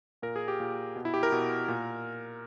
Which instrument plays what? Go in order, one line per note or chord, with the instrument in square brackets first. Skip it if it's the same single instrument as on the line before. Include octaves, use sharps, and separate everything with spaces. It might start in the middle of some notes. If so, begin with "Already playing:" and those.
[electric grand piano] A#2 A#4
G#4
G4
A#2
B2
E4
G4
A#4
B2
A#2